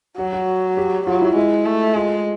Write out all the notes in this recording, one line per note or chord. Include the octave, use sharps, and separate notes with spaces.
F#3 F#4
F#4
G4
F#3 F4
E4
G#3 E4
A3
G#3 F4